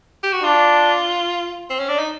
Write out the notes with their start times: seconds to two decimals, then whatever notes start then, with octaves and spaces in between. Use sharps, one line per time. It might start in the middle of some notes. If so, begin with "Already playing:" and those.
0.23 G4
0.33 F#4
0.44 D4 F4
1.70 C4
1.79 C#4
1.89 D4
1.99 D#4